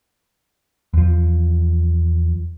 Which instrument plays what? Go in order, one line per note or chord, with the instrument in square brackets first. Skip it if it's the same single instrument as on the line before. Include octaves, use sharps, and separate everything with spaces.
[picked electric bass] E2 F3